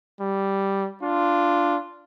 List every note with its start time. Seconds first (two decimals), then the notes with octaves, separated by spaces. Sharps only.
0.21 G3
1.03 D4 F4